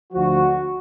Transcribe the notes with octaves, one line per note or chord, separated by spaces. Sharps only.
D2 D3 F3 F#4